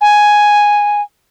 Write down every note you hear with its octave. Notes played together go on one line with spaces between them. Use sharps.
G#5